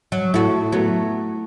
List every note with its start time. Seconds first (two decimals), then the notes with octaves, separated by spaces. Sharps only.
0.12 F#3
0.34 A2 A3 F#4
0.72 F#3 A3 B3